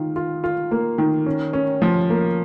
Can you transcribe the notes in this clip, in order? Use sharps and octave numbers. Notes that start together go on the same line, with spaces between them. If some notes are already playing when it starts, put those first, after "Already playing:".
Already playing: D#3 F4
F4
F4
A#3
D#3
C#4
C#4
F3
A#3